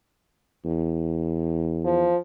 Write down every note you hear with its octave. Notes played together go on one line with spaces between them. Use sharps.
E2
F3